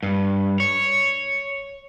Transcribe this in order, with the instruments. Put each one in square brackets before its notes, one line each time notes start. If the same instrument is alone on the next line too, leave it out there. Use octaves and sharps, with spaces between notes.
[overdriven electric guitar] G2
C#5